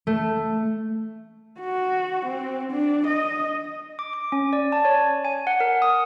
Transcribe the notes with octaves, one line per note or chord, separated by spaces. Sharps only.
A3
F#4
C4
D4
D#5
D6
D6
C#4
D5
A5
C#5
G#5
F#5
A#4
D#6